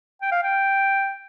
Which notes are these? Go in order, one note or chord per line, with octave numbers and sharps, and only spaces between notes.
G5
F5
G5